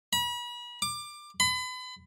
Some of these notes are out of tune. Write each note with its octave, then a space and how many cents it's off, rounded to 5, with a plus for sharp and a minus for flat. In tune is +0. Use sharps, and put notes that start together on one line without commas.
B5 -40
D6 +20
B5 +35